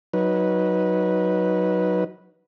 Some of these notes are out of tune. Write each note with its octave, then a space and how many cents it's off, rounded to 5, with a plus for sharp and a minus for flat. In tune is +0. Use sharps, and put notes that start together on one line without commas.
F#3 +0 D#4 +10 B4 -10